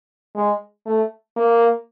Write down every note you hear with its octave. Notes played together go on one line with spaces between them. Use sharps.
G#3
A3
A#3